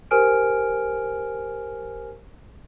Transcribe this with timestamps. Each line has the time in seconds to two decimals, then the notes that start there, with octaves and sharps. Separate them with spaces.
0.11 G4 A#4 C5 G#5 F6 D7